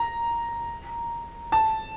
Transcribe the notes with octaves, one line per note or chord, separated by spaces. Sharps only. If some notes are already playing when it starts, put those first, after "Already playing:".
Already playing: A#5
A5